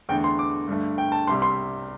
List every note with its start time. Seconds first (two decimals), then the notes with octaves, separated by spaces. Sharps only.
0.09 E2 D3 A3 G5
0.24 C6
0.39 D6
0.68 G2 D3 A3
0.98 G5
1.12 A5
1.27 C2 C3 G3 C6
1.42 C6